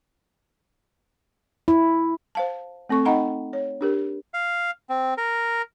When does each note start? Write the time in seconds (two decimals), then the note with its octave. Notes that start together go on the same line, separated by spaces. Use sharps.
1.68 E4
2.35 C5 F5 A5
2.89 A3 C4 A4 C#6
3.05 D#4 D#5 F#5 G5 A#5 B5
3.53 C#5
3.81 D4 G4 A#4
4.34 F5
4.89 C4
5.18 A#4